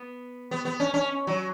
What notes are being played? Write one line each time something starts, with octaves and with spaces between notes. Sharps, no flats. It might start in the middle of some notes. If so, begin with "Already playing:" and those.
Already playing: B3
B3
B3
C#4
C#4
F#3